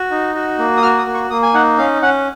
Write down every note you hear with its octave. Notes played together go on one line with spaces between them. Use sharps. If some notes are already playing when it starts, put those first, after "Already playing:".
Already playing: F#4
D#4
F#4
A#3
D#6
F#4 F6
D#6
A#3
C#6
A#3 D#6
G#5
D#4 F#5
C#4 F5
C#4 F#5